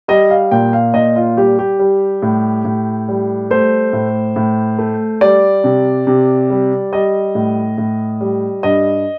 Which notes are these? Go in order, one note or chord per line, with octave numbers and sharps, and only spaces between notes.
G3 D#5
F5
A#2 G5
F5
A#2 D#5
F4
G3 G4
G4
G3
A2
A2
G3
A3 C5
A2
A2
A3
G3 D5
C3
C3
G3
G3 D#5
A2
A2
G3
G2 D#5